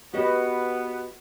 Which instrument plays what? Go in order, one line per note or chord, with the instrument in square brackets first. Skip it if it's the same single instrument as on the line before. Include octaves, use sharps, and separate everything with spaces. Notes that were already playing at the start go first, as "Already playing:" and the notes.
[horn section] B3 [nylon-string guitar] F#4 G4 D#5